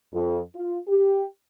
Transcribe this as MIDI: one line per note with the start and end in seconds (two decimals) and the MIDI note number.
0.13 0.39 41
0.55 0.78 65
0.88 1.24 67